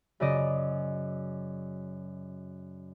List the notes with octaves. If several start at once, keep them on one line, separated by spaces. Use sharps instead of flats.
F#2 C#3 D5 D#5